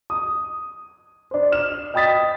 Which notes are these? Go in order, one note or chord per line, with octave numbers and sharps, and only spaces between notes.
D#6
D4 C5
F6 E7
D#5 G5 B5 D#6 A6 B6